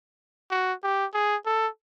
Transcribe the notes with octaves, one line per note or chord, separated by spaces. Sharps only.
F#4
G4
G#4
A4